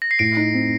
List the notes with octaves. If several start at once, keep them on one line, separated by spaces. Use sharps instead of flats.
A#6
C7
A2 D7
D#4
C4